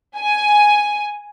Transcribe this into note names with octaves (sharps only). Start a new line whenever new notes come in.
G#5